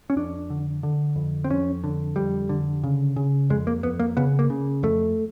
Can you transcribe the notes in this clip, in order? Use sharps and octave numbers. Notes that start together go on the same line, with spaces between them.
C#4
F2 D4
D3
D3
F2
C4
F2 C#4
D3
F2 G3
D3
C#3
C#3
F2 G#3
A#3
F2 B3
A#3
C#3 B3
A#3
C#3
F2 A3